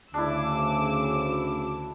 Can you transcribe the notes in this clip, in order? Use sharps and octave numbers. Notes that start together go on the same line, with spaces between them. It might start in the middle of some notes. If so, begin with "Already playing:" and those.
D2 C#3 D4 E4 D6 E6